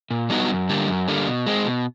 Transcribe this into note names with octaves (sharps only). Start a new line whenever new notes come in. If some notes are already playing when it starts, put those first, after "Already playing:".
A#2
G3 B3 D#4 F#4
F#2
D3 G3 A#3
F#2
D3 G3 A#3
B2
G#3 C4
B2